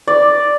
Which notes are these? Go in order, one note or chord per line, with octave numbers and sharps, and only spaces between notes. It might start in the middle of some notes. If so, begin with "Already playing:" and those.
D5